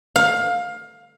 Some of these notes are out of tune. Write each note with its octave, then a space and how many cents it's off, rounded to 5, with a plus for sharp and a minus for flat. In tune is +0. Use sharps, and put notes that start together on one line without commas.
F5 +20